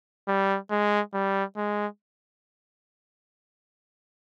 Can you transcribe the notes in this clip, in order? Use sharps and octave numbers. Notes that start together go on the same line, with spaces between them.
G3
G#3
G3
G#3